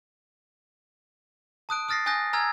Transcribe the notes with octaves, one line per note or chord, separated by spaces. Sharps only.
A5 D#6 F#6 D7
D#6 F6 A6 A#6 C7
G#5 D#6 F#6 G6 A#6
G#5 A#5 E6 F6 G#6